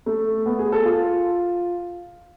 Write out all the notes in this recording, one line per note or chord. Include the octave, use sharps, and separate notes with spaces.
A3
B3
G#4
A4
F4